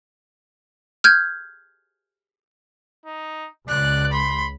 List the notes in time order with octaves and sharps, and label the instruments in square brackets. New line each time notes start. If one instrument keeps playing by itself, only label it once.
[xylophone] F6 G6 G#6
[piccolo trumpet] D#4
[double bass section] C#2 [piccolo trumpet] D5 [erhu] F#6
[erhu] B5 [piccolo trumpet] C6